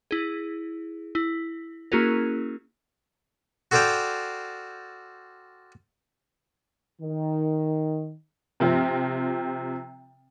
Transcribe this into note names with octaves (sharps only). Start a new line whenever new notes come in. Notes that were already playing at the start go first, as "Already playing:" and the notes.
E4 G#4
E4
A#3 C#4 E4 F#4 G#4 A#4
F#4 A4 C5 D5 F5 G5
D#3
C3 F3 C4